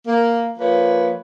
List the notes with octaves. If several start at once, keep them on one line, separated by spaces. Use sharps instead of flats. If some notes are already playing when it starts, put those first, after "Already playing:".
A#3
F3 A#3 B4 C#5